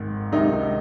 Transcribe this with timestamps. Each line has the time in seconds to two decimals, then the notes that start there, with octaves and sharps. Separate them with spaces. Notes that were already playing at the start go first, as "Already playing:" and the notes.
Already playing: G#1 G#2 D#3
0.32 C#2 C3 D#3 D#4